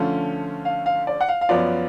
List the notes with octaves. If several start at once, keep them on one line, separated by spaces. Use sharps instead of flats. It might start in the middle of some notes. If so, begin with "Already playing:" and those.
Already playing: D3 F3 A3 C#4 F4
F5
F5
D5
F#5
F5
F5
F#2 F3 B3 F4 D5